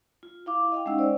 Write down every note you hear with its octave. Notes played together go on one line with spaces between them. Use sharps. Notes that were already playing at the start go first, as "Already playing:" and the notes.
F4
E4 F5 D6
D#5 F5 G5
G#3 C#4 D#4 F#5 E6
C5 D5